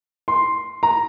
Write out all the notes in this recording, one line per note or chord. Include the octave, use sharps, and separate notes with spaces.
C6
A#5